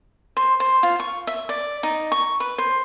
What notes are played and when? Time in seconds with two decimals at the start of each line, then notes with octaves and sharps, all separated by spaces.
0.37 C5
0.60 C5
0.83 F4
1.00 C#6
1.27 E5
1.49 D5
1.83 D#4
2.12 C#6
2.40 B4
2.58 C5